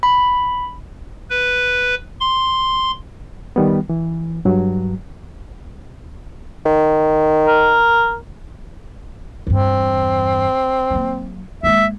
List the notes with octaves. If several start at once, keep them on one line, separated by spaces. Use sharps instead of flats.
B5
B4
C6
D#3 G3 B3
E3
G2 F#3
D#3
A#4
E2 G2 C4
F#3 A#3
G#3 A#3 E5